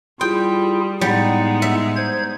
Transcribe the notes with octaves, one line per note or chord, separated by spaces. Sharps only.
G3 E4 F4 G#4 G5
A2 G3 G#3 B3 D#4 F#5
E5
C5 G#6